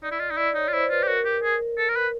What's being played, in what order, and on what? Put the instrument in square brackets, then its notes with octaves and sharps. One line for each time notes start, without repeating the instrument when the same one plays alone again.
[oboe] D#4 [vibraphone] D5
[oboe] E4
[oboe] F4 [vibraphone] D#5
[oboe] D#4
[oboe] E4 [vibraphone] D5
[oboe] D#4 [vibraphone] C#5
[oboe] F4
[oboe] E4 [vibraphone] C5
[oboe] F4 [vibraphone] B4
[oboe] G4
[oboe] F#4 [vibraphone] A#4
[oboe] G4
G#4
A4
A#4
B4